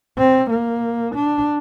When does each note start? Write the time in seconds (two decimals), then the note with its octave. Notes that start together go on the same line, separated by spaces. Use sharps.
0.18 C4
0.50 A#3
1.15 D4